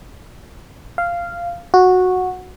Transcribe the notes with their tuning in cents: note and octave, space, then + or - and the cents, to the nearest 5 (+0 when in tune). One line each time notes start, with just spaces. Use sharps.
F5 -10
F#4 -10